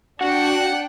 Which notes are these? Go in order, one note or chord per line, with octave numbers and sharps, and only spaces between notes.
D4 F#4 F#5 G5